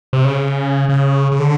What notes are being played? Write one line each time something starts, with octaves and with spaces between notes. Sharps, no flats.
C3
C#3
C#3
C#3
D3